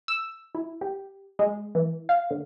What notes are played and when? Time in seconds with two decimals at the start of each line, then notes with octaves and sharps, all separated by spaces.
0.08 E6
0.55 E4
0.81 G4
1.39 G#3
1.75 E3
2.09 F5
2.30 D3